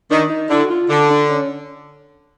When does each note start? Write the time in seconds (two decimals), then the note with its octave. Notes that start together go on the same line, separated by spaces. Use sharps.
0.11 D#3 D4
0.30 D#4
0.50 D3 E4
0.65 F#4
0.70 F4
0.90 D3 D4
1.10 D4
1.31 C#4